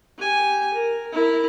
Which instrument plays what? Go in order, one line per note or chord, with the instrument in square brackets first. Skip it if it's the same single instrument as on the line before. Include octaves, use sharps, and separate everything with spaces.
[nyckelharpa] G4 G#5
A#4
E4 A#4